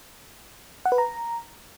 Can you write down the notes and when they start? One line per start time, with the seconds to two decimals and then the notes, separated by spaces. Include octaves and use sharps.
0.86 F#5
0.92 B4
0.98 A#5